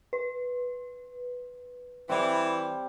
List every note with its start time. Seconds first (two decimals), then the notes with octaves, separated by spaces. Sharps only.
0.13 B4
2.09 E3 G3 C4